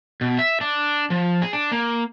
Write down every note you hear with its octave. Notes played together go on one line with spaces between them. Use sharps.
B2
E5
D4
F3
G#4
D4
A#3